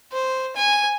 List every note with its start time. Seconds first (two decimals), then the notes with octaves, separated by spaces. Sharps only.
0.12 C5
0.56 G#5